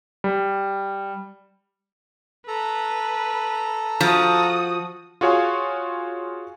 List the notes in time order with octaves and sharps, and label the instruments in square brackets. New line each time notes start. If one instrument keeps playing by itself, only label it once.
[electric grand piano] G3
[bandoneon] A4 A#5 [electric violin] B4
[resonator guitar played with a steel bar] F3 [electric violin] F#4 D#6
[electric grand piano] F4 F#4 G#4 C#5 F5 G#5